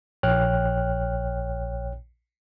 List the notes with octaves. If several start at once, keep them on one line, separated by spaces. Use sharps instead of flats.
A#1 C#5 G5 F6 F#6